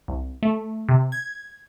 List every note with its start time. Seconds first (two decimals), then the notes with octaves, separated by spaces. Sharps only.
0.08 C2
0.43 A3
0.89 C3
1.12 G#6